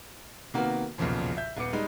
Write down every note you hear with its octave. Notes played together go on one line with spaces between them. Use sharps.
C3 D#3 A#3 B3 F#4
B1 E2 A#2 C#3 F3
E5 G6
D#1 B3 D6 C#7
G3 G#3 D#4